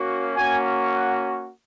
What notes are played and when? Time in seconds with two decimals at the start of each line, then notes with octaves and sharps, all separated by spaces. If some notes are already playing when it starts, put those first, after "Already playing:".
Already playing: A#3 C#4 F#4
0.37 A#3 C#4 F#4 G#5
0.95 F#5